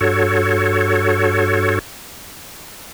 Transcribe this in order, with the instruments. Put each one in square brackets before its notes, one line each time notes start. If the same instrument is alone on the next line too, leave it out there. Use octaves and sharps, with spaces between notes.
[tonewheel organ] G2 F#4 A4 C#5